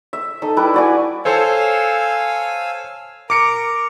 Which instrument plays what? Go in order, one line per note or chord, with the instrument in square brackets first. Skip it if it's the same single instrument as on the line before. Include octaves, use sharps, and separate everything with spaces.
[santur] E5
D#4 A4 D#5
G3 E4 B4 D6
F#4 D5 G#5
[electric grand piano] A4 C5 C#5 [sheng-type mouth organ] F5 G#5 E6
[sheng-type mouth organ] A#4 A#5 [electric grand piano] D6 C#7 D7